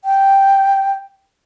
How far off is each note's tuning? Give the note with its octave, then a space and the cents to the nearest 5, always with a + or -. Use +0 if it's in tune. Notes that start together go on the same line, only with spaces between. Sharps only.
G5 +0